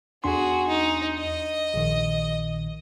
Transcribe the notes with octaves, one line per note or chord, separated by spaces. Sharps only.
E2 D4 F#4 G#4 C6
D#4
D#5
A#1 A#2 D#3